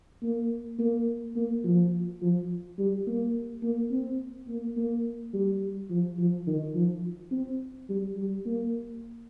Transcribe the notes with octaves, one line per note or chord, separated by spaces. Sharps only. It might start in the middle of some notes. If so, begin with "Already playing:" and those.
A#3
A#3
A#3
F3
F3
G3
A#3
A#3
C4
A#3
A#3
G3
F3
F3
D#3
F3
C4
G3
G3
A#3